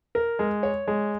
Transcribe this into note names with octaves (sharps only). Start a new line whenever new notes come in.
A#4
G#3
C#5
G#3